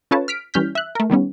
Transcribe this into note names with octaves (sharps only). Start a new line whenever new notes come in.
C#4 F4 A4 B4 C#5 A5
F6 B6 D7
E3 G3 C#4 F6 G6 B6
E5 F#6
A3 A#4
D#3 G3 B3 C#4